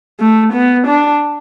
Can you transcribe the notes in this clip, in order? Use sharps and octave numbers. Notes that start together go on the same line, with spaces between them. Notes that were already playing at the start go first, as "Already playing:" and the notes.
A3
B3
D4